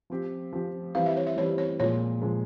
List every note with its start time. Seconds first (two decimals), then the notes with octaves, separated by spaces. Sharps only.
0.10 F3 C4 G4
0.53 F3 C4 G4
0.95 E3 G3 C4 F5
1.06 E5
1.17 C#5
1.27 E5
1.37 E3 G3 C4 C#5
1.58 C#5
1.80 A#2 F3 G#3 C#5
2.22 A#2 F3 G#3